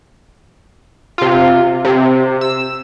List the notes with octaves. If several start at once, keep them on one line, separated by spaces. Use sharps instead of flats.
C3 F4
C3
E6